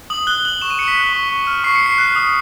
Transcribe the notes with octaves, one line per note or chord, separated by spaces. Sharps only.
D#6 F#7
F#6 G7
F#6 F#7
C#6 E7
D#7
C#6 C#7
B6
F#6
C#6
C#6
F6
C#6 C7
C#7
C#6
C7
F#6
D#6